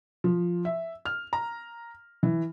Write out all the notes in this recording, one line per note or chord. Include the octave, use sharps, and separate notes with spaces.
F3
E5
F6
A#5
E3